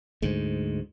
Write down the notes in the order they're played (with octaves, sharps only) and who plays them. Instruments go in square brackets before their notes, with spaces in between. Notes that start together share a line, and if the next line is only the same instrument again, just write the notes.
[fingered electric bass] D2 G#2